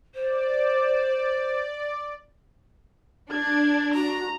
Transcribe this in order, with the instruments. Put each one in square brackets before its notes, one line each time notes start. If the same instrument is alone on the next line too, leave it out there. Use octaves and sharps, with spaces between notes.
[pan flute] C5 [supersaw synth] D5
[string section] D4 [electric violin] G#6
[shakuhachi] F#4 [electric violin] A#5